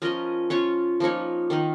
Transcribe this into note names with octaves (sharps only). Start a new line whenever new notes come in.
F3 C#4 A#4 D#5
C#4 F4 C#5
F3 A#3 D#4 C#5
D#3 A#3 D#4